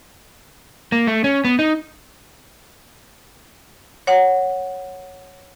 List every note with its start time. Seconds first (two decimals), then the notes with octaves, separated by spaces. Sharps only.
0.92 A#3
1.07 A3
1.24 C#4
1.45 B3
1.59 D#4
4.07 C#5 F#5